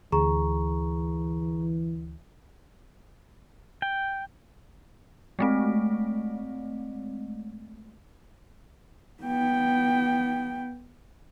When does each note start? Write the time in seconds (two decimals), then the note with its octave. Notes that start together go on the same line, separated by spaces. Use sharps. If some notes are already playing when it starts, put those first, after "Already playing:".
0.12 D2 E3 G#4 A#5 C#6
3.82 G5
5.39 G#3 A3 C4
9.23 B3 G5